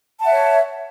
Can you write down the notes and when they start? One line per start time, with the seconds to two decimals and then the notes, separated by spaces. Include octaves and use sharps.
0.19 A5
0.23 F#5
0.26 E5
0.30 C#5